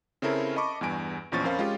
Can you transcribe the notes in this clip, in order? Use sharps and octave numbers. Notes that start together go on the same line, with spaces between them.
C#3 C4 C#4 E4 A4 A#4
D#5 A5 B5 C#6 D6
E2 G2 G#5 D7
A#1 E2 F3 C#4 C#6 A6
F2 C#4 A#4 C5 F5 B5
G#3 C#4 F4 G4